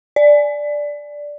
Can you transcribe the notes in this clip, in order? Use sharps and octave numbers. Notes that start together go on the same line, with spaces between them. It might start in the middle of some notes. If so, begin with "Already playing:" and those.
D5